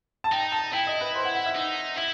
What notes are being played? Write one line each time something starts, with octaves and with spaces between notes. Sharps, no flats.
A5
D#4 G5
A5
E4 G5
D#5
B4
C5
F#5
F#5
E5
D#4
E4 E5